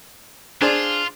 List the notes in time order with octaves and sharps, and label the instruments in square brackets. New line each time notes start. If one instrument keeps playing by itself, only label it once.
[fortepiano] D4 G#4 C5 [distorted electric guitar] F4